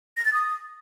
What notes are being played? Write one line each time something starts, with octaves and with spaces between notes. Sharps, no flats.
A#6
A6
D#6